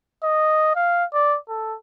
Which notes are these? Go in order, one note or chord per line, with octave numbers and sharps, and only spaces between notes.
D#5
F5
D5
A4